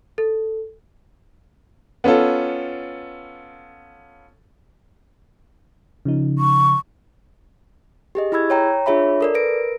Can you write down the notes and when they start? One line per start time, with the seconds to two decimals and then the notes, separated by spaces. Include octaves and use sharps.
0.18 A4
2.04 B3 C#4 F4 A4
6.05 C#3 F3 D#4
6.38 C#6
8.15 G4 G#4 D#5
8.32 E4 G#4 B5 E6 G#6
8.50 C#5 G5 A#5
8.86 D4 F4 G#4 C#5 E5 B5
9.21 A4 A#4 D5
9.34 A#4 B4 A#6 D7